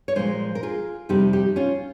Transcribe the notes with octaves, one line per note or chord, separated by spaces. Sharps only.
C#5
A#2 F3 G#3 G#4 C5
A#4
F4 G#4
F2 C3 G3 C4 D#4 G4
D#4 G4
C#4 F4